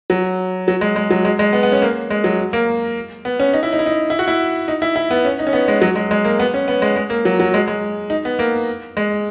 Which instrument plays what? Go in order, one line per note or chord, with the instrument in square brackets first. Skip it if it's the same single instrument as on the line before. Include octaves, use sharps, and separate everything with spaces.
[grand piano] F#3
F#3
G#3
G#3
F#3
G#3
G#3
B3
B3
C#4
A#3
G#3
F#3
A#3
B3
C#4
D#4
E4
D#4
E4
D#4
E4
F#4
E4
D#4
E4
E4
B3
C#4
D#4
C#4
B3
G#3
F#3
G#3
G#3
A#3
B3
C#4
B3
G#3
G#3
A#3
F#3
F#3
G#3
G#3
D#4
B3
A#3
G#3